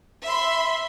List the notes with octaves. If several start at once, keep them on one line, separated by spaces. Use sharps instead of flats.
E5 B5 C6